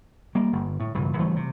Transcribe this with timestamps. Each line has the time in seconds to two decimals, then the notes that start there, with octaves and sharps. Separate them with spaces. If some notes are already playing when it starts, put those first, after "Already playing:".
0.35 G3 A#3
0.53 G1
0.80 A2
0.94 E1 C#2 G2 E3
1.18 G#1 E3 G3 A3
1.36 C3